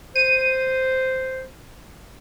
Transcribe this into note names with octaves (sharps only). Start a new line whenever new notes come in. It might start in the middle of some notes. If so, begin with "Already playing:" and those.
C5 D#7